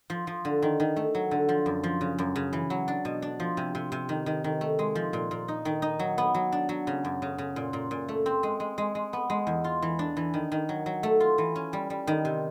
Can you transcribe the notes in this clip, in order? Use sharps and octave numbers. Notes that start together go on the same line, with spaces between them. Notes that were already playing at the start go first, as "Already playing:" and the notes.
F3
F3
D3
D#3
D#3
A3
F#3
D3
F3
F#2
F3
C#3
F#2
C#3
E3
F#3
D4
B2
D4
F3
C3
C3
C3
D#3
D#3
D#3
A3
G#3
F3
A#2
A#2
D#4
D#3
D#4
F#3
B3
F#3
D4
F#3
C#3
F#2
C#3
C#3
A#2
A#2
A#2
A3
C4
G#3
G#3
G#3
G#3
B3
G#3
E2
F4
E3
D4
E3
D#3
D#3
F#3
F#3
A3
F4
E3
C#4
G3
G3
D#3
C3